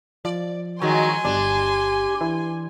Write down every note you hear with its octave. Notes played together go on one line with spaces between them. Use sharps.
F3 D5
D#3 F#3 G#3 F#4 G#5 C6
G1 D4 G4
E3